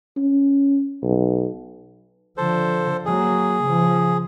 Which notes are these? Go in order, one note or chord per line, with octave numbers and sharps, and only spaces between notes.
C#4
B1
D3 F3 A4 C5
F#3 A#3 G#4
C#3 F3